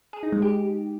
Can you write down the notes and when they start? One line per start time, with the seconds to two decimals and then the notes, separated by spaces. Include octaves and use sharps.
0.13 G#4
0.23 D#4
0.32 G#3
0.42 G4